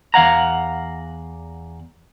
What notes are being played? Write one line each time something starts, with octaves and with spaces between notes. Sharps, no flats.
E2 F5 F#5 A#5